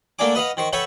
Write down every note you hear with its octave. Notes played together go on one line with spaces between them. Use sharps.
D3 A3 A#3 D4 G#5 D6
B4 D#5 F5 F#5
D#3 C5 C#6
A4 B4 C#5 E5 F#5 G5